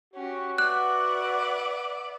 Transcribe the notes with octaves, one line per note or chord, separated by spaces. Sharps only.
C#4 F#4 G4
B4 D5 E5 F#5 F#6